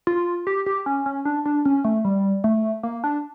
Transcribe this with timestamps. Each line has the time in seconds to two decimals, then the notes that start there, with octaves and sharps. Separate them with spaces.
0.07 F4
0.47 G4
0.66 G4
0.86 C#4
1.06 C#4
1.25 D4
1.46 D4
1.65 C#4
1.84 A3
2.05 G3
2.44 A3
2.83 A#3
3.04 D4